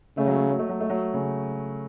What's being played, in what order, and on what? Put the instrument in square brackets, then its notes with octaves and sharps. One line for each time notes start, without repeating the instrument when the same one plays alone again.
[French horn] C#3 [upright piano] A3
[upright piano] F#3
A3
F#3
A3
F#3
A3
F#3
C#3